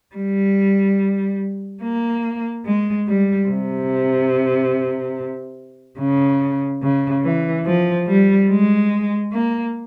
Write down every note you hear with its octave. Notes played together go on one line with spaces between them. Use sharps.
G3
A#3
G#3
G3
C3
C#3
C#3
E3
F3
G3
G#3
A#3